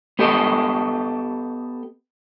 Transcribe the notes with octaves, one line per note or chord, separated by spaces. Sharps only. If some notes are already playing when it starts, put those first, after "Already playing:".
B3 G4 A4 D#5